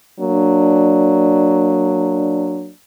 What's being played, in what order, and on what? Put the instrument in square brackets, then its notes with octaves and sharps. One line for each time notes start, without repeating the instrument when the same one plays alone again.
[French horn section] F#3 A#3 D4